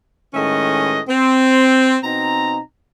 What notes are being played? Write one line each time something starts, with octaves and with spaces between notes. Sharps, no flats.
A2 D#3 G#3 C#4 B4 D#5
C4
B2 C4 D#4 A#5